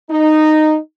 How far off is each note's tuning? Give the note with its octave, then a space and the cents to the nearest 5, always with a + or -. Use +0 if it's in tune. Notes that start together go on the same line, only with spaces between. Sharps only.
D#4 -10